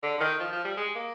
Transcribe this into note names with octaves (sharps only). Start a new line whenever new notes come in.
D3
D3
D#3
F3
F3
G3
G#3
A#3